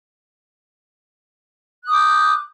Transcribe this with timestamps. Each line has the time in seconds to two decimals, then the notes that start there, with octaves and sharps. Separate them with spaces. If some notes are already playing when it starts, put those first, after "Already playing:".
1.83 F#6
1.87 D#6
1.91 D6
1.94 G6